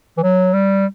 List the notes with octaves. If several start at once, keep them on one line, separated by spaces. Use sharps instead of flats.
E3
F#3
G3